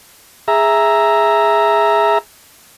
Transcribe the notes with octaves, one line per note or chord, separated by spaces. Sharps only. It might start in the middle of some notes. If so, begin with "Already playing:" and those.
G#4 E5 A#5